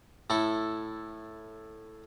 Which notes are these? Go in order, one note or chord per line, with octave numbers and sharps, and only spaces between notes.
A2 E4 A4